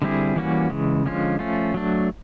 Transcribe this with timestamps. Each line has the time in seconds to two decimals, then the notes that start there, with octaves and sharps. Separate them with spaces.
0.02 D3 G3 C4 E4 G#4
0.36 E3 G3 A#3 C#4 F#4
0.70 C#3 E3 G#3
1.06 D3 F3 G#3 C#4 F4
1.39 F3 A3 C#4 F4
1.74 F#3 A3 D4